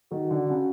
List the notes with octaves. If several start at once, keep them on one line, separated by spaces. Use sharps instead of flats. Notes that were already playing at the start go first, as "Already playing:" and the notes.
D#3 F#4
D3
C#3